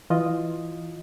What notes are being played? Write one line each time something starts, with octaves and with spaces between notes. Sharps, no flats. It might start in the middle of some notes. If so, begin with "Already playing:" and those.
E3 F4 D#5